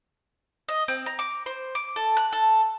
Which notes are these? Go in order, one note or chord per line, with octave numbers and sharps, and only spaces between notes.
D#5
C4
A#5
D6
C5
D6
A4
F#6
A4